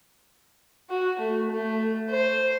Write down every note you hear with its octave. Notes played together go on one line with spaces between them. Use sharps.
F#4
A3
A3
C5